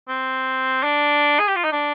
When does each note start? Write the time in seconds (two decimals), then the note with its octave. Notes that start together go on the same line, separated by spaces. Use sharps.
0.09 C4
0.83 D4
1.39 G#4
1.48 G4
1.56 F4
1.64 D#4
1.72 D4